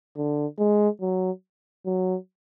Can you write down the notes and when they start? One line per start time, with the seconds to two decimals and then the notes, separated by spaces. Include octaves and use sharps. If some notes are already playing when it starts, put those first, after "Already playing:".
0.17 D3
0.59 G#3
1.01 F#3
1.86 F#3